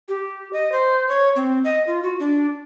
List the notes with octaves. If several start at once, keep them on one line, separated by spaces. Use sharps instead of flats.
G4
D#5
C5
C#5
C4
D#5
F4
F#4
D4